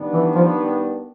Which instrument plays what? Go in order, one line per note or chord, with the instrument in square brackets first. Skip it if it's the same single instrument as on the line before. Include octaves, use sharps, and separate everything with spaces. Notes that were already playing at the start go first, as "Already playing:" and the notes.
Already playing: [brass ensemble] D#3 G3 B3 D4
[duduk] E3
F3